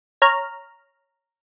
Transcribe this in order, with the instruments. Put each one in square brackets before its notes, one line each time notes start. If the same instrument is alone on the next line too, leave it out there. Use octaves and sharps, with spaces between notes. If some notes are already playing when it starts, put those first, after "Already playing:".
[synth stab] C#5 A#5 F6